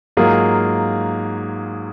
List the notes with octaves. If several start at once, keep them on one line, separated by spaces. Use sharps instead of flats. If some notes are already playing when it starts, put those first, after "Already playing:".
G#2 F#3 A#3 F4 G#4